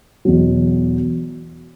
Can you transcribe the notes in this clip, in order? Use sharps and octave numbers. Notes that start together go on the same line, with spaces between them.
E2 B2 F#3